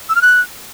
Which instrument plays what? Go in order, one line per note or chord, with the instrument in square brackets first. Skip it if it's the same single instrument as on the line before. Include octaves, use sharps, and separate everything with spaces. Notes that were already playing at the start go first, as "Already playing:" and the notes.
[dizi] E6
F6
F#6